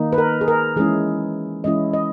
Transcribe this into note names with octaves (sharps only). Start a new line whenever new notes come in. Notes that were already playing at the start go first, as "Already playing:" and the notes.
Already playing: D#3 A#3 D#4
B4
A#4
G#4
A#4
E3 G#3 C#4 E4 G#4
E3 G#3 C#4 E4 D#5
D#5